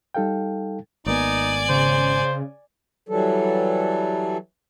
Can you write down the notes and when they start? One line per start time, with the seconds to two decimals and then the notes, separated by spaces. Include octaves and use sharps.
0.14 G3 D#4 A4 F5 G5
1.06 G#1 A#3 B3 D#4 D5 G#5
1.69 C#3 C5
3.09 E3 F#3 G3 A4